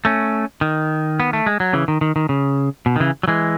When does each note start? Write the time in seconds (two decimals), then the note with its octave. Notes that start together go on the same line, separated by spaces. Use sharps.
0.05 A3 C#4
0.61 D#3
1.20 B3
1.33 A3
1.46 G#3
1.60 F#3
1.73 C#3 E3
1.88 D#3
2.01 D#3
2.16 D#3
2.29 C#3
2.86 B2
2.96 D#3
3.00 C#3 E3
3.23 F#3
3.28 E3 G#3